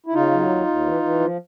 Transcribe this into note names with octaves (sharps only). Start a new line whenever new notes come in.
E4
C#3 D#4 F4
F#3
D#2
D#2
E3
E3
F3